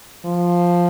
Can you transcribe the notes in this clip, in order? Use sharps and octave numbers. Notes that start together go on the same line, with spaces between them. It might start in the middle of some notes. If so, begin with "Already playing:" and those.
F3